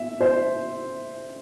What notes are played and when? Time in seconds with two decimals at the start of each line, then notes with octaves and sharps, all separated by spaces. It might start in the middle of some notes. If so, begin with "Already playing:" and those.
Already playing: E5
0.21 C5